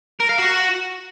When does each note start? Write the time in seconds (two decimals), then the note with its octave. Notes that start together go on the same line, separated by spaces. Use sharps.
0.20 A#4
0.29 F5
0.39 F#4